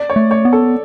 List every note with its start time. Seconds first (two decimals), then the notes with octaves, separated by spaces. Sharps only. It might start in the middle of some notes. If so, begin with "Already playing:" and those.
Already playing: D5
0.10 C#5
0.16 A3
0.31 C#5
0.45 B3
0.53 A4